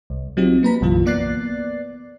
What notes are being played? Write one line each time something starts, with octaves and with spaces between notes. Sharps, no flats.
C2
F#3 C4 D#4 F4 G4
A#3 B4 A#5 B6
B1 F#2 C#3 E3 F4
A#3 B3 D5 F#6 A6 C7